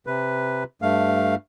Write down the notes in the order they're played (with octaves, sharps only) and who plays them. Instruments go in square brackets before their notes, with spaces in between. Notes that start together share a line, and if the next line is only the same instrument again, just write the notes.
[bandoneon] C3 B4
G2 A3 F5